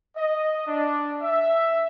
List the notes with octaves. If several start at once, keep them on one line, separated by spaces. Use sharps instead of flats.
D#5
D4
E5